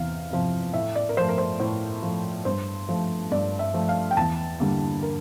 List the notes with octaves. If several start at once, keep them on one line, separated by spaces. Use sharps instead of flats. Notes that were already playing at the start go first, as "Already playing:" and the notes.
Already playing: E2 C3 F5
C3 F3
A2 E5
D5
A#4
F3 A3 C5
A#4
C5
A2 C5
F3 A3
G2 C5
F3 A3
G2 D5
E5
F3 A3
F5
G5
E2 A5
D3 G3 A#3
A#4